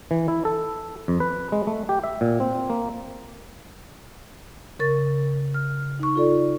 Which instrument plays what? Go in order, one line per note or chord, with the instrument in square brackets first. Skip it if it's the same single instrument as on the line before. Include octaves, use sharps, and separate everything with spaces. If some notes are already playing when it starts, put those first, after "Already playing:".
[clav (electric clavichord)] E3
E4
A4
F2
B4
G#3
A3
G4
E5
A#2
C4
A#3
[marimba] C#3 A#4 C#6 A6
F6
D#4 C#6
F4 A4 D5